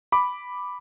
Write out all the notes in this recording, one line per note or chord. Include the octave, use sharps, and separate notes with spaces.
B5 D6